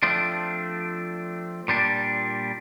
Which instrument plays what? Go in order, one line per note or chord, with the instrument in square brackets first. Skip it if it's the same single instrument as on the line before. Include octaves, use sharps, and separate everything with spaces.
[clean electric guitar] F3 A3 C4 D4
A#2 G3 D4